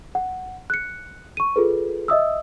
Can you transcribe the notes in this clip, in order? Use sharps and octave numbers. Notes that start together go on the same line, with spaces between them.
F#5
F#6 C#7
C#6 D#7
F4 G#4 A4 B4
D#5 E5 D#6 E6